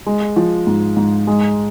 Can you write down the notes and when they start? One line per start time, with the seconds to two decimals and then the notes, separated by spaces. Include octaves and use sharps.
0.07 G#3
0.36 F3
0.67 G#2
0.97 G#2
1.27 G#3